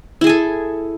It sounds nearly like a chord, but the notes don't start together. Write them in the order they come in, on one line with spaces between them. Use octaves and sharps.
E4 G#4 G#5 A4